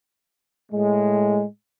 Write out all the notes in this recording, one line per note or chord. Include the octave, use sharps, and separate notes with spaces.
A2 G#3